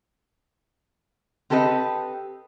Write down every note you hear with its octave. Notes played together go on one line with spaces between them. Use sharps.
C4 G4 A4 B4 D#5